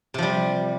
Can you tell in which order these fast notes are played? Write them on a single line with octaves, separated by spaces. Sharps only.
C3 F3 G3